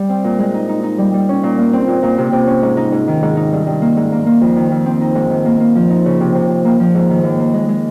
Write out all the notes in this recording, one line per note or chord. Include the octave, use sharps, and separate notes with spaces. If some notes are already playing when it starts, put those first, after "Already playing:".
Already playing: G3
C4
A#2
G#3
D#4
D#4
D#4
G3
G3
C#4
A#2
A#3
C4
A#2
A#2
C3
C3
C#4
G#2
D#4
G#2
D#3
G#2
D#4
G2
G2
A#3
G#2
A#3
A#3
F2
D#3
F2
C4
D#4
G#2
D#3
A#3
A#3
F3
D#4
C#3
C3
C3
C3
A#3
F3
G#2
D#3
D#2
A#3
G#3
G#3